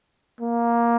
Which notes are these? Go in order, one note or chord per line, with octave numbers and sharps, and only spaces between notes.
A#3